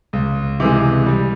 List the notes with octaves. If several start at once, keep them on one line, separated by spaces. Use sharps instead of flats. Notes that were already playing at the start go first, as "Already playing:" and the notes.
C#2
C3 E3 G#3
G3